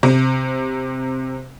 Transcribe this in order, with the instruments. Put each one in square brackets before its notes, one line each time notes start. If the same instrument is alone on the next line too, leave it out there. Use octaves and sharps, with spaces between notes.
[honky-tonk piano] C3